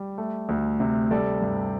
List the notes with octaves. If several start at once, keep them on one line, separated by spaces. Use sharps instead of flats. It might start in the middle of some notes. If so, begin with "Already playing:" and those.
Already playing: G3
A3
D2
C3
G3 A4 D5
G2